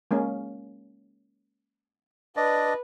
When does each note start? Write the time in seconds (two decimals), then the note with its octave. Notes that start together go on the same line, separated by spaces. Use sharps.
0.11 G#3 A#3 C#4
2.37 D4 B4 D5 D#5